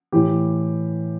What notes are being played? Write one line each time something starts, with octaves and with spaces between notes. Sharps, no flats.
A2 E3 G4